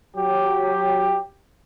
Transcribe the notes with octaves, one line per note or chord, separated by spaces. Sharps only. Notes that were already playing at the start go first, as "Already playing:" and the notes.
F#3 G4